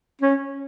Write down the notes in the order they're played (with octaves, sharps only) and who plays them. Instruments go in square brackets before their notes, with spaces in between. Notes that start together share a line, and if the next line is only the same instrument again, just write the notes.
[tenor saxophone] C#4